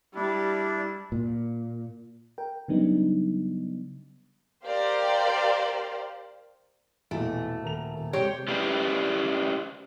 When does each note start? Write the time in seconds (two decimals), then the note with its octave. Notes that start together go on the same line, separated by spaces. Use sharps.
0.15 G3 D4 E4
1.12 A#2
2.38 A#4 G5
2.68 C#3 F#3 G3 B3 D4 D#4
4.64 G4 A#4 C5 D5 F5
7.11 A#1 E2 B2 A3
7.62 D#1 A#4 F7
7.95 D#1
8.13 C3 G#3 G4 C5 C#5
8.48 C#4 E4 G4 B4 C5 D5